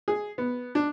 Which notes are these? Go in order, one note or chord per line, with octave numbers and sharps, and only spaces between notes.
G#4
B3
D4